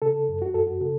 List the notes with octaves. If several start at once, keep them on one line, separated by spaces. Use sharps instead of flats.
C#3 A4
F#2
F#4
F#2 A4
F#4
C#3 A4